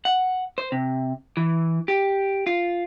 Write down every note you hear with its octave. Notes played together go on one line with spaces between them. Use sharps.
F#5
C5
C3
E3
G4
F4